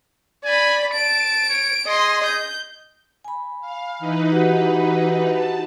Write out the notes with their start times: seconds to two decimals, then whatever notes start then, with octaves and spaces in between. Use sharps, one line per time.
0.45 D5 G#5 B5
0.94 A5 D7
1.49 C#5
1.87 G#4 D#5 C6
2.26 G6
3.24 G#5 B5
3.61 F5
3.99 E3 D#4 B4
4.32 F#4 G4 F#5
5.31 A5